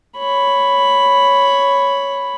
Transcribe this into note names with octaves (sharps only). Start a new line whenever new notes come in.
C#5 B5